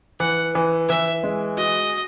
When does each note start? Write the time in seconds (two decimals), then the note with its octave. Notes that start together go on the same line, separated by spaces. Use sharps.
0.20 E3 F#5
0.55 E3
0.89 E3 E5
1.24 G#3
1.58 F#4 D#5